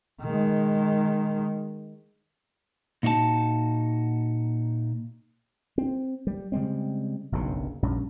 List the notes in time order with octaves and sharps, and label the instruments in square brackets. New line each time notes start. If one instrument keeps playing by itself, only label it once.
[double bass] D#3 G#3
[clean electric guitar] A#2 D#4 F#4 C#5 A5
[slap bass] C4
G3
C#3 G3 G#3 C4
F#1 B1 G2 C#3
A#1 G2 C#4